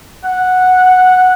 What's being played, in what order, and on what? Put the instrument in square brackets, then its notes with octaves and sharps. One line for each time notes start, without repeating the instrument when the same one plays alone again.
[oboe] F#5